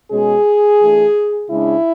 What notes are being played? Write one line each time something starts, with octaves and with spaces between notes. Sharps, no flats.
B2 G#3 C#4 G#4
E3 A3 D4
C#3 G#3 D4 E4